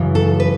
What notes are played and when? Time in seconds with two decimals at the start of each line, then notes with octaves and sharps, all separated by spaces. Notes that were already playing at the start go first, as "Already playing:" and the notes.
Already playing: F#2 C#3 E3
0.15 A4
0.40 B4